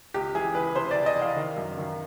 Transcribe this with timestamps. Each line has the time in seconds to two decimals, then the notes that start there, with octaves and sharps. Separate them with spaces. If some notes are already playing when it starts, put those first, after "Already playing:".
0.14 C#2 G4
0.35 E3 G#4
0.55 E3 B4
0.75 C3 C5
0.91 E3 D5
1.06 D#5
1.16 E3
1.22 F5
1.36 D#3
1.57 F#2
1.77 D#3